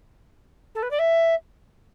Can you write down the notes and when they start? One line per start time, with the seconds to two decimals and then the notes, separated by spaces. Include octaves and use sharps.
0.75 A4
0.83 B4
0.91 D5
0.99 E5